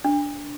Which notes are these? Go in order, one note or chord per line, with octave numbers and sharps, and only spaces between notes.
D4